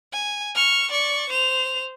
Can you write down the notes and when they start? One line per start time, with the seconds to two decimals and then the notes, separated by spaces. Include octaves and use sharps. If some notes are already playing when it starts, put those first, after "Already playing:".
0.13 G#5
0.55 C#6 F6
0.91 D5 C#6
1.30 C5 F7